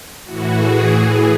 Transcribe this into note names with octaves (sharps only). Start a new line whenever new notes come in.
A2 E3 F#4
G#4
A2 E3